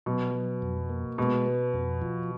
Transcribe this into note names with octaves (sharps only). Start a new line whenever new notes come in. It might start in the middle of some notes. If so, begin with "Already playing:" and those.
B2 F#3
F#3
F2
A#3
B2 G#3
B3
F2
F3